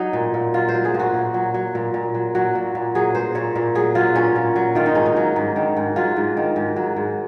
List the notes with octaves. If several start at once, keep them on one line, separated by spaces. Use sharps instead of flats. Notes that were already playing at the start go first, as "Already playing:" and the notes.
Already playing: F#3 D#4
A#2
A#2
F#3 F4
C5
F#3
G#4
A#2
F#4
A#2
F#3
F#3
A#2
A#2
F#3
F#3 F#4
A#2
A#2
F#3 G#4
F#3 C5
A#2 C#5
A#2
F#3 G#4
F#3 F4
A#2 C#4
A#2
F#3
D#3 F4
D#4
G#2 C#4
D#4
F#3
G#2
D#3
G#2
F#3 F4
G#2
D#3
G#2
F#3
G#2